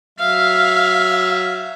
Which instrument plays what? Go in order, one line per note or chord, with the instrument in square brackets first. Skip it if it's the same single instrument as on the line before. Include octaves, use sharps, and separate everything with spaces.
[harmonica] F#3 E5 [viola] F5